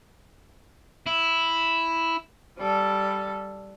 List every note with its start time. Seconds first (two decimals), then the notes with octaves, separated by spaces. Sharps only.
1.06 E4
2.58 G3 A4